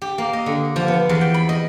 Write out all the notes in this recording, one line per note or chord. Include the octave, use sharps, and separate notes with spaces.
G4
A#3
D#5
D3
F3
B3
E2
G5
B5
D#5